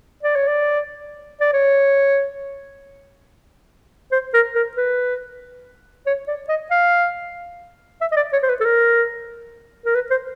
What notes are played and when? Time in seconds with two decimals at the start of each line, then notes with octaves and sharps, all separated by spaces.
0.23 D5
0.35 C#5
0.48 D5
1.40 D5
1.53 C#5
4.12 C5
4.34 A#4
4.55 A#4
4.77 B4
6.06 C#5
6.28 D5
6.49 D#5
6.71 F5
8.01 E5
8.11 D#5
8.16 D5
8.33 C#5
8.43 C5
8.49 B4
8.60 A4
8.65 A#4
9.86 A#4
9.95 B4
10.10 C5